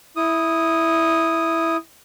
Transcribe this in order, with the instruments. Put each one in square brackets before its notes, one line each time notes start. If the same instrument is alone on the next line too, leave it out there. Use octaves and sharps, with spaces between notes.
[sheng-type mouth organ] E4 D#6